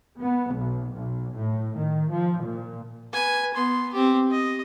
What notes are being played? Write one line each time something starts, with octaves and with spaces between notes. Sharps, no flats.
B3
B1
B1
A2
D#3
F3
A#2
B4 G#5
B3 C6
C4 G4
D#5